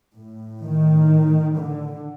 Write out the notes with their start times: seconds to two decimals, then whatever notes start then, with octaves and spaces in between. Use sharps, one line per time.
0.16 A2
0.63 D#3
1.56 D3